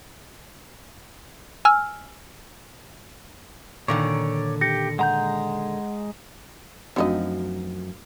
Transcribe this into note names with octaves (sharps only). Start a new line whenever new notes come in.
G#5 E6 F6
A#2 D3 D#3 C#5 D5
G4 A#6 C#7
G#3 F#5 A#5 G6
F#2 F3 A3 C4 D4 D#4 F#4 D#5